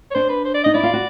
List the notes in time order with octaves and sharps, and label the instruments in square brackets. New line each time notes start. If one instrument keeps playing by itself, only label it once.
[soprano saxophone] C#5
[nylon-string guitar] D4 [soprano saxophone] C5
[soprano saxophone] B4
C5
D5
[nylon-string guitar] D#4 [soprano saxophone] D#5
[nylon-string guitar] E4 [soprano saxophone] D5
[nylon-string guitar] F4
F#4